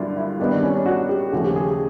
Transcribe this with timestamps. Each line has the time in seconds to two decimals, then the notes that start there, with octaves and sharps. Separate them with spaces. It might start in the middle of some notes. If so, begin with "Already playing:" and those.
Already playing: G2 D3 F#3 A#3 D4 E4 F4
0.17 E4
0.39 G2 D#3 G3 B3 D4
0.51 D4
0.63 C#4
0.75 D4
0.86 F#4
1.09 G4
1.32 D#2 C#3 F3 A3 F#4
1.44 G4
1.56 G#4